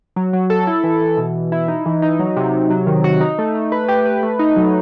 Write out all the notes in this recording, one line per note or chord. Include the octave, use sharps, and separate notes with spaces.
F#3
F#3
A4
E4
E3
E3
B2
B2
E4
D#4
E3
D#4
F#3
C3
C3
F#3
D#3
F#4
D#4
A3
A3
B4
G4
B4
A3
D#4
F#3